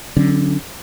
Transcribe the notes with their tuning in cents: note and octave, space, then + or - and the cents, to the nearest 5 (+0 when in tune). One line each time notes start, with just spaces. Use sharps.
D3 +0 F#3 +0 C#4 -35